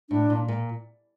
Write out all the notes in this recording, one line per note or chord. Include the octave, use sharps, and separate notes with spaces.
A2 D4
A#2
A#2